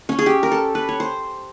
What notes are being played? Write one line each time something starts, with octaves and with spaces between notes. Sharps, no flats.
C#4
G#4
G4
A#4
A4
B4
C#5
C5